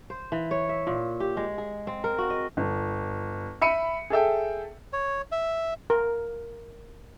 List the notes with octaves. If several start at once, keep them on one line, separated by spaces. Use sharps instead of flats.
C5
E3
C#5
E5
A#2
G4
G#3
G#4
C4
A#4
F#4
D#5
G1
E5 B5 C#7 D#7
G#4 A4 E5 G5
C#5
E5
A#4